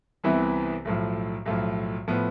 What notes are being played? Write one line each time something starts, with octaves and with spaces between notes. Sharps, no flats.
C2 C3 E3 B3 E4
B1 A2 F3
B1 A2 F3
A2 F3 B3